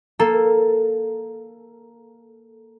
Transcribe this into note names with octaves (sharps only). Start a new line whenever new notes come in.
A#3 A4